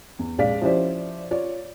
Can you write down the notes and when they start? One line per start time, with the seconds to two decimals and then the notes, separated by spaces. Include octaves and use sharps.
0.19 E2
0.38 A#1 G#3 D5 F5 B6
0.61 F3 C#4 E4 G4 C5 D5
1.31 F4 C#5 D5